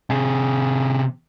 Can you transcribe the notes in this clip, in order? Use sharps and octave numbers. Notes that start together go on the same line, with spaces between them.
C3 G#4